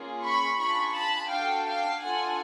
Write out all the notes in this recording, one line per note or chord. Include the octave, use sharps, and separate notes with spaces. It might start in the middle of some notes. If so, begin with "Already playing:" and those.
Already playing: A#3 C#4 F4 G#4
B5 C#6
D4 F4 G#4 B5 C#6
A5 B5
D4 F#4 A4 F5 G5
F5 G5
D4 F4 A4 F#5 G#5